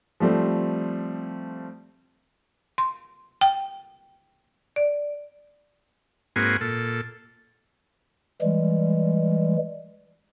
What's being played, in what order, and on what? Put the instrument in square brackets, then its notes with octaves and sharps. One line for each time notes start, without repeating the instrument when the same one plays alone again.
[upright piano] F3 G3 A3 C4
[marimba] C6
G5
D5
[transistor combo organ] G#2 A#3 C4 F#4 B4 G#5
A#2 A4
[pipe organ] E3 G3 G#3